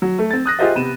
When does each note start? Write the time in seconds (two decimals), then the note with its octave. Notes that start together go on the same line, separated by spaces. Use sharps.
0.02 F#3
0.18 A3
0.31 C4 A6
0.46 D#6 F#6 A#6
0.59 F4 G4 G#4 C5 D#5 E5
0.75 C3 B3 D#7 E7